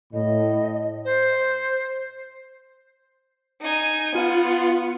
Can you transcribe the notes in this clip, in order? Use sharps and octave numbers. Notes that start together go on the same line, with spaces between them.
A2 D#5
C5
D#4 G#5
B3 F4